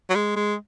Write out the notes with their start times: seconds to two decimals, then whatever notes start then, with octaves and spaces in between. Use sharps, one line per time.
0.10 F#3
0.15 G#3
0.36 G#3